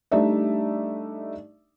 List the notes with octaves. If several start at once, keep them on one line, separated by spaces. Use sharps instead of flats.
G3 A3 D4 D#4 D5 E5